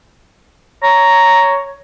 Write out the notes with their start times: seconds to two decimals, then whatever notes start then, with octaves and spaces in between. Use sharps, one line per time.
0.83 C#5 A#5